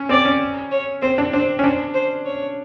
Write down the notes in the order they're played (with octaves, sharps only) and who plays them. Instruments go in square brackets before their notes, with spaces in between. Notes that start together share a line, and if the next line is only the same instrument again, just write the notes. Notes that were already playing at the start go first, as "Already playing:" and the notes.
Already playing: [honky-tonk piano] C#4
[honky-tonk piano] C4 [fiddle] D5
[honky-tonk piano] C#4
[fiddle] C#5
[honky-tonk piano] C4 [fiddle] C5
[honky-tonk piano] D4
[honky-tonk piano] D4 [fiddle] C5
[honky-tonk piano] C#4
[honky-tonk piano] D4 [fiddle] C5
[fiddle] C5
C#5